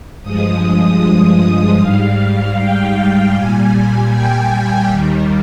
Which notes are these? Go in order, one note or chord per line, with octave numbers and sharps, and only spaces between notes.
G2 F3 G#3 D#6
G#2 G3 F5
G5
A#2 G3 G#5
G5
D#2 D#3 G3